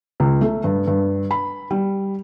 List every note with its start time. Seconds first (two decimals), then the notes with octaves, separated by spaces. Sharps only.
0.20 C#2
0.41 A3
0.64 G2
0.87 G2
1.31 B5
1.71 G3